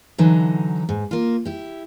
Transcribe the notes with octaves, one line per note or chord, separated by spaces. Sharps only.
D3 E3 F#3 D#4
G#2
A#3 F4
E4 G4